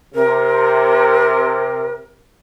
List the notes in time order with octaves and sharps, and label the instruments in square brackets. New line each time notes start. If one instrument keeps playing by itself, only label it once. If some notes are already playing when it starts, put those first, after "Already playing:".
[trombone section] C3 [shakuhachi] A#4